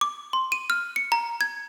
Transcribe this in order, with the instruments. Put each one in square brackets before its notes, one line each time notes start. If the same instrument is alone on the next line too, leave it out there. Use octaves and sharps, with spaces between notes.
[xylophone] D6
C6
D#7
F6
C#7
A#5
G#6